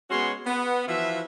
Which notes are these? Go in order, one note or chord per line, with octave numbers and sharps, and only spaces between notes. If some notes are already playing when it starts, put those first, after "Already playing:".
G#3 B3 C#4 F#4 C#5 C6
B3
E3 F3 F4 F#4 E5